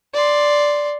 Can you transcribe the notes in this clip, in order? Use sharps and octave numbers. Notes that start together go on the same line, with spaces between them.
D5 C6